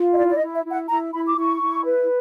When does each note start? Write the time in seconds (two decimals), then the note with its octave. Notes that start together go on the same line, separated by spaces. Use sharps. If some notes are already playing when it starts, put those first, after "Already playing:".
Already playing: F4
0.13 D#5
0.17 E4 D5
0.29 D5
0.35 D#5
0.42 E4
0.54 E5
0.65 E4
0.71 F#5
0.89 E4 A#5
1.13 E4 B5
1.26 D6
1.37 E4 C#6
1.61 E4
1.85 B4